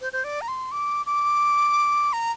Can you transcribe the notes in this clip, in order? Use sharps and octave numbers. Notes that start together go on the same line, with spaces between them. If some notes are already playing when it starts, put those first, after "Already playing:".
C5
C5
D5
A#5
C6
D6
D6
A#5